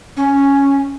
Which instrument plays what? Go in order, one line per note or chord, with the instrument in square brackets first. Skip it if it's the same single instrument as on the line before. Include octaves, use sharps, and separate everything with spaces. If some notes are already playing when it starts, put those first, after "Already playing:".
[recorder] C#4